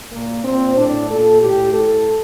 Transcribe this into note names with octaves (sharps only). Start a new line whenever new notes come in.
A#2 A#3
A#2 C4
A2 D4
A#2 A4
A2 G4
A2 A4